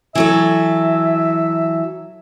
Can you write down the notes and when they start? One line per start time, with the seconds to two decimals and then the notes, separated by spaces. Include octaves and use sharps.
0.15 E3 F#3 A4 E5